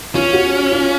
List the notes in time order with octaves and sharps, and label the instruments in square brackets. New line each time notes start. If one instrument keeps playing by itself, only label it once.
[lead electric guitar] C#4 [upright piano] F4
[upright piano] F#4
F4